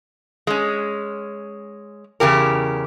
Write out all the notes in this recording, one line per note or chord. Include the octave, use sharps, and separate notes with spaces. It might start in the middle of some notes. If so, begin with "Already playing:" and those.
G#3 C#4
E2 A#2 C#3 G4 A#4